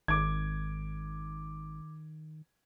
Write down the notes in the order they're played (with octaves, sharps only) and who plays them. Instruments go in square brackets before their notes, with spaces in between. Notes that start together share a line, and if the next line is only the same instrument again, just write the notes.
[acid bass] G#1 [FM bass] D#3 [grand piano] D6 G#6